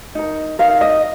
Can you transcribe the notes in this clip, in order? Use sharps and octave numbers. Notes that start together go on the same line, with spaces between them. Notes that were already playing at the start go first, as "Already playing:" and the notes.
D#4 A#4
D#4 A#4 F5
D#5